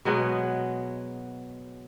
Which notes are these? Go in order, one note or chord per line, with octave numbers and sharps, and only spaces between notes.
B2 F#3 G#3 B3